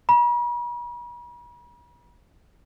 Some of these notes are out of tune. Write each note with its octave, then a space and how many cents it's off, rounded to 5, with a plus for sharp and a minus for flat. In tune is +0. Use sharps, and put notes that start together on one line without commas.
B5 -45